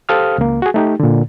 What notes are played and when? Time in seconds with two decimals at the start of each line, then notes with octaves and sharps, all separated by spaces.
0.09 G4 A4 C5 F5 D#6 F6
0.38 C#2 A#3
0.62 F#4 G#4
0.74 A3 D#4 G4
1.00 A#2 D3